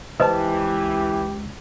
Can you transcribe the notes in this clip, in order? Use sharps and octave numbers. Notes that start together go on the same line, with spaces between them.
C#2 E3 G4 B4 C5 D#5 A5